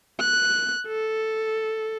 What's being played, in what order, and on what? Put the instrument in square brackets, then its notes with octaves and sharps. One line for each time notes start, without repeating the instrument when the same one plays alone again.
[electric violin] F#6
A4